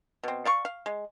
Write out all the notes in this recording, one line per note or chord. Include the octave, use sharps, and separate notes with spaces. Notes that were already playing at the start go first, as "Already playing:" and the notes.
B2 C4
D5 F5 C#6
F5
G#3